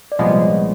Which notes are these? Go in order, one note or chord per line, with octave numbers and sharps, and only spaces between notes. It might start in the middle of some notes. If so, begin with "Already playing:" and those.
D5
C2 A#2 F3 G#3 B3 D#5
C#5